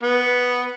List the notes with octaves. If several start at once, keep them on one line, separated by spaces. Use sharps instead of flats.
B3